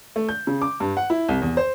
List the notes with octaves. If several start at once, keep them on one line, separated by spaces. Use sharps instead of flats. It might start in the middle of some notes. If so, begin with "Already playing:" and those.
A3
G6
C#3
D6
G2
F#5
E4
C2
E2
C5